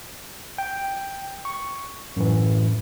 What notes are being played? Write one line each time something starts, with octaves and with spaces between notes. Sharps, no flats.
G5
C#6
F#2 A2 E3